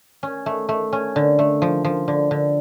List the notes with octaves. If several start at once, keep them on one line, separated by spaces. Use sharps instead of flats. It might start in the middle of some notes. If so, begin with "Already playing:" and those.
C#4
A3
A3
C#4
D3
A3
F3
F3
D3
D3